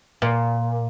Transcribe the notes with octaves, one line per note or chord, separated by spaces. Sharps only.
A#2